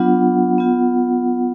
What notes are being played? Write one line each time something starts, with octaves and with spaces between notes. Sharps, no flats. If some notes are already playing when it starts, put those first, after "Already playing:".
Already playing: F#3 B3 D4 F4 F#5
B3 F4